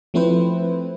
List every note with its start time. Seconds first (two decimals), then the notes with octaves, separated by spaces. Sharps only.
0.14 F3 A3 C4 E4 B4 C5